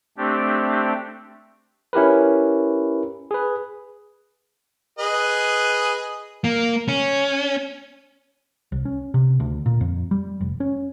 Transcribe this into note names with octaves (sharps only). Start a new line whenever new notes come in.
A3 C4 D4 G4
C#4 E4 G4 A#4 B4
G#4 B4
G#4 B4 D#5
A#3
C#4
C2
C#4
C3
D2
A#2
F2
G3
F1
C#4